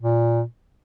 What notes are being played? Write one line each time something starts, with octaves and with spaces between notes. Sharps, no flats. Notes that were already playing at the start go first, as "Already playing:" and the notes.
A#2